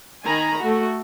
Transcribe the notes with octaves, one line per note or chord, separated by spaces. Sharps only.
D#3 G#5 A#5 B5
A3 F#4